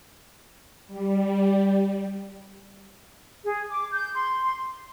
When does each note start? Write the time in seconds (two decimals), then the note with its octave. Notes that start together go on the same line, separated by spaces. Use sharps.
0.87 G3
3.43 G#4
3.69 D6
3.92 G6
4.13 C6